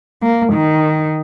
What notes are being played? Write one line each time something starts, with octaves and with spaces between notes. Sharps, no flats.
A#3
D#3